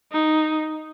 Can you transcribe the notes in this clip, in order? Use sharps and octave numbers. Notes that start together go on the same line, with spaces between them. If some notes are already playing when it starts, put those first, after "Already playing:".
D#4